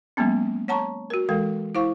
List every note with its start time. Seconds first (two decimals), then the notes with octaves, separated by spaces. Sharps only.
0.17 F#3 G#3 A#3 B3 C#4
0.68 C#5 F#5 A5 A#5 C#6
1.10 F#4 A#4
1.29 E3 G#3 A4 A#4 F5
1.75 E4 C5 F5 C#6